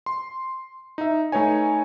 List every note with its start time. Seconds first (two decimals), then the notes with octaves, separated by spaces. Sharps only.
0.06 C6
0.98 D#4 E5
1.32 A3 D#4 B4 C#5 G#5